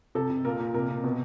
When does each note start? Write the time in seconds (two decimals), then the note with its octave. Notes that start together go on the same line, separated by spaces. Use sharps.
0.15 C3 A4
0.30 C3
0.45 A#2 A#4
0.59 A#2
0.74 C3 A#4
0.89 C3
1.04 B2